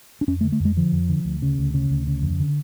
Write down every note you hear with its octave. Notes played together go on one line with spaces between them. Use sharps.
D4
F2 C#4
A3
D3
A3
F2
G#3
D3 F3
F2
D3
D2
C#3
D2
C#3
D2
C#3
F2
D3